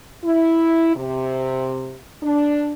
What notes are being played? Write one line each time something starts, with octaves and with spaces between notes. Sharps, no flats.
E4
C3
D4